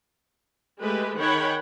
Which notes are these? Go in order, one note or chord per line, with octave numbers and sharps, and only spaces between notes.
G#3 A3 G4 B4
D#3 G#4 C#5 F#5 G5 B5